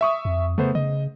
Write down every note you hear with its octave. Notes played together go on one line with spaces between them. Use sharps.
E5 C#6 D#6
F2
C#3 A3 B3 C5
C#3 D#5